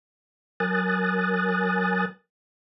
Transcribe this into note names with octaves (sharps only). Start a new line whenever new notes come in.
F#3 A#4 G#5 D#6 F#6 A6